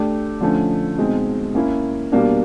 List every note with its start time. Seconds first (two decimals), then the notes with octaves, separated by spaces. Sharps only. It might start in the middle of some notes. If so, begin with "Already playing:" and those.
Already playing: A3 D4 G4
0.41 D3 F3 A3 C#4
0.98 B2 G#3 C4 D#4
1.55 A#3 C#4 E4
2.12 B2 G3 A#3 D4